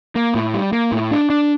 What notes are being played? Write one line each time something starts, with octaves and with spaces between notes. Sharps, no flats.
A#3
A2
G3
A#3
A2
D4
D4